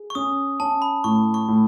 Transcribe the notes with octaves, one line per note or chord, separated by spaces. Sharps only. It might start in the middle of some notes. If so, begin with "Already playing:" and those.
Already playing: G#4
C#6
C#4 D#6
C#4 A5
B5
A2 C#6
C#6
A2